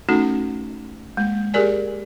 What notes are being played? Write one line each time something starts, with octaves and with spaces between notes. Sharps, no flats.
A3 C#4 D#4 F#4 A4
G#3 A#3
G4 G#4 A#4 D5 G#5